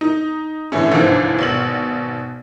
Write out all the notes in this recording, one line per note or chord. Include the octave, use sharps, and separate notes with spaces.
D#4
A2 D3 E3 A3 C#4
G1 C2 G#2 D3 E3 F3
G#1 B2 F#7